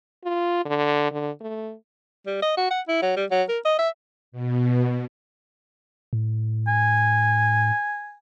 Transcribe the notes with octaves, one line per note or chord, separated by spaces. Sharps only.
F4
D3
D3
A3
G3
D#5
F#4
F#5
E4
F#3
G3
F#3
A#4
D#5
E5
B2
A2
G#5